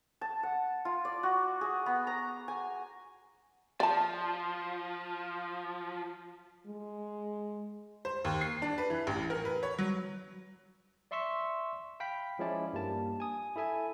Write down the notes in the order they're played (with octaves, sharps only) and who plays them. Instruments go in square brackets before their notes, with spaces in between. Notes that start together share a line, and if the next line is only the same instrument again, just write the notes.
[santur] A5
F#5
F4
D5
F#4
G#4
B3
A#5
G#5
[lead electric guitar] F3 [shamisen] D5 A5
[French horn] G#3
[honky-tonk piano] C5
D#2
C7
D4
B4
E3
A1
A#4
B4
C#5
F#3
[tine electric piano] D5 E5 C6 C#6 E6 B6
F5 G5 B5 B6
F3 G#3 C#4 E4 D5
G2 G3 A#3 A5
G#5 D#6
E4 A4 E5 G#5